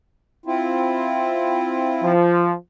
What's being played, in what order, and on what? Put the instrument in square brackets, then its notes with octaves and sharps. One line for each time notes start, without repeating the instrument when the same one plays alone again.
[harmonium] C4 E4 F4
[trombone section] F3